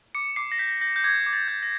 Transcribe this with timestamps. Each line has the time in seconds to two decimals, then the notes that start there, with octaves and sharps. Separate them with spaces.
0.15 D6 C#7
0.36 D6 C7
0.52 A#6
0.59 G6 B6
0.81 G6 A#6
0.96 G6
1.04 D6 G#6
1.26 D6
1.33 A6
1.48 G6
1.63 A#6